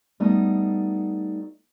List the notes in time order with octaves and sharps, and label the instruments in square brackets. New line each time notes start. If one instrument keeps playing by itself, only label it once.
[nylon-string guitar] G3 A3 B3 D#4 F#4